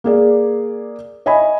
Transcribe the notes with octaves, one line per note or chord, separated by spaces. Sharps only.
A#3 G#4 D5
C#5 D#5 E5 G#5 B5